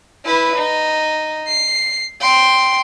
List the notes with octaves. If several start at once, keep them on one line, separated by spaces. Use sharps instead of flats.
E4 B4
D#4
C7
G5 C6